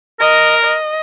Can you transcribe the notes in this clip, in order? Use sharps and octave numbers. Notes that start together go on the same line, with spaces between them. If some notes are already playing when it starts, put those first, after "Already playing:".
A#4 D#5
D#5